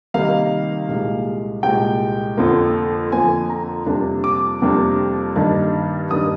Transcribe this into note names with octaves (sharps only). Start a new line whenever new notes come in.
C3 D#3 G3 A#3 D#4 F5
C2 A#2 G#3
C2 A#2 G#3 G5
F2 D3 F3 A#3
F2 D3 F3 A#3 G#5
A#5
F2 C3 G3 A#3 D4
D6
F2 C3 G3 A#3 D4
G2 D#3 A#3 D4
G2 D#3 A#3 D4 D#6